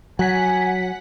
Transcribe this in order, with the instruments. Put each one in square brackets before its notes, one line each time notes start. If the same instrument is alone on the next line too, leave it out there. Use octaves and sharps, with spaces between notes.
[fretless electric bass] F#3 [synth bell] F#5 B6 [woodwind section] G#5